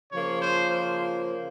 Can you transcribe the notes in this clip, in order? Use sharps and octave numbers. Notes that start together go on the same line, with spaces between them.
C#3 F3 A#3 C#5
C5
C5